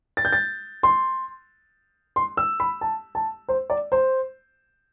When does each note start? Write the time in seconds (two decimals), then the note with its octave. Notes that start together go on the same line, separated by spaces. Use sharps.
0.17 A6
0.25 G6
0.33 A6
0.83 C6
2.16 C6
2.37 E6
2.60 B5
2.81 A5
3.15 A5
3.49 C5
3.70 D5
3.92 C5